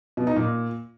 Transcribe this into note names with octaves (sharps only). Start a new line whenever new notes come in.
B2
D#4
A#2